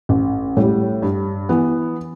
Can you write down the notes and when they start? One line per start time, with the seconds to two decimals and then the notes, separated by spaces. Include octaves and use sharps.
0.09 A1
0.57 A2 G3
1.02 G2
1.49 E3 B3